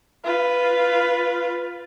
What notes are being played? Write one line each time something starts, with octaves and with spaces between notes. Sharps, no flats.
F4 B4